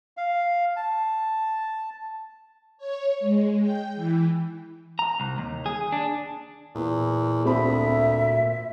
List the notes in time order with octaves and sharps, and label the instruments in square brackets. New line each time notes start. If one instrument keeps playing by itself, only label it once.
[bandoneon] F5
A5
[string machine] C#5
G#3
G5
E3
[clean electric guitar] A#5
C2
D#2
G#4
D4
[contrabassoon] E2 [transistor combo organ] A#2
[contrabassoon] D2 [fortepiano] C4 B5 [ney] E5